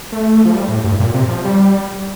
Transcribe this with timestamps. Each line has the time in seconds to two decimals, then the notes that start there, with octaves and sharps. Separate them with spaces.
0.12 A3
0.45 F3
0.53 G3
0.68 A2
0.84 G2
1.00 A#2
1.14 C3
1.29 F3
1.45 G3